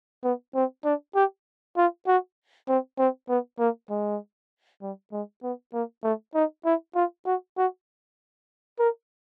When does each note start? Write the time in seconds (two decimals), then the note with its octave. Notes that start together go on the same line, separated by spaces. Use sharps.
0.24 B3
0.55 C4
0.84 D4
1.15 G4
1.77 F4
2.07 F#4
2.69 C4
2.99 C4
3.29 B3
3.59 A#3
3.90 G#3
4.82 G3
5.12 G#3
5.43 B3
5.73 A#3
6.03 A3
6.35 D#4
6.65 E4
6.95 F4
7.26 F#4
7.57 F#4
8.79 A#4